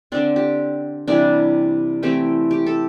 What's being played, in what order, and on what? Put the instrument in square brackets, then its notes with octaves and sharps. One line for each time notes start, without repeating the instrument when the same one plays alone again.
[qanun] D3 C4 D4
G4
C3 E3 G3 D4
E3 A3 C4 G4
G4
A4